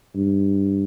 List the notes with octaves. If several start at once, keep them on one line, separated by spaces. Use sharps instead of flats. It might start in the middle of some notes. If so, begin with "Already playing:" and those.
G2